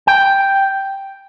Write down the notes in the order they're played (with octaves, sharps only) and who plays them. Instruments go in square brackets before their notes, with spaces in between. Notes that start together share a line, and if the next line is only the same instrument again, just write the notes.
[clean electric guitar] G5